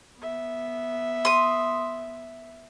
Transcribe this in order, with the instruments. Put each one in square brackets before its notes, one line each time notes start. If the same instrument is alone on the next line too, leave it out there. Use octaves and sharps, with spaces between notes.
[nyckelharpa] B3 E5
[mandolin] C6 D#6